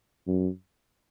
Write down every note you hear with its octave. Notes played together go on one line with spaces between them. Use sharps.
F#2